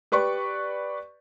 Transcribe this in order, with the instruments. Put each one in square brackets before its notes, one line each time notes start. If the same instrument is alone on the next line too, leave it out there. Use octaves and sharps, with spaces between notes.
[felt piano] G4 B4 D5 C#6